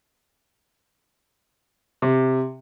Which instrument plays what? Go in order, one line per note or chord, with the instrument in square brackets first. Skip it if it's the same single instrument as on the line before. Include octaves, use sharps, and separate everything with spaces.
[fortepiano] C3